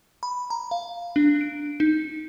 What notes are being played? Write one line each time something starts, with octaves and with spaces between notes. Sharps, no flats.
B5
A#5
F5
D4
D7
D#4